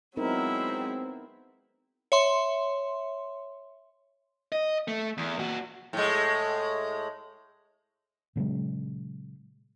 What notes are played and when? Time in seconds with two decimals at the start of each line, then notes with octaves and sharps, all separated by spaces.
0.17 F#3 G#3 B3 C4 D#4 E4 A#4
2.12 C#5 E5 C6
4.52 D#5
4.88 A3
5.17 E2
5.39 A#2 F#4
5.93 A2 G#3
8.36 A#2 C#3 F#3 G#3